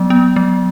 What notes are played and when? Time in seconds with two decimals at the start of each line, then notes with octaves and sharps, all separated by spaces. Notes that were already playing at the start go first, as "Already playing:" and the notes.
Already playing: F#3 B3
0.10 B3
0.36 F#3